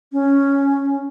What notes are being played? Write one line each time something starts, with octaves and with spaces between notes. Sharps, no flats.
C#4